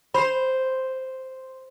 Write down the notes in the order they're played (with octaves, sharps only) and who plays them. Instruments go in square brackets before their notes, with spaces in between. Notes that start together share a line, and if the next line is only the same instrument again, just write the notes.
[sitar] C5 [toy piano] B5